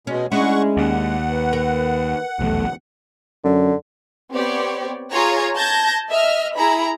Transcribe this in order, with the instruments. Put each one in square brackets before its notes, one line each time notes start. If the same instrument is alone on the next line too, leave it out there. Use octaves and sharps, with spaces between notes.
[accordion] B2 G#3 [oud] C#4
[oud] G#3 D4 E4 [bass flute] C#4 [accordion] F#5 C#6
[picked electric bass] D#2 [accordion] F#5
[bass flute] B4
[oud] A#4
[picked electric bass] F1 B1 E2 [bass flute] A3
[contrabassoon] F#2 [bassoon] D3
[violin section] B3 C4 G4 C#5 D5
F4 G#4 C#5 A#5 G#6
A5 G6 G#6 A#6
D#5 E5 F6
E4 G#4 A#5 B5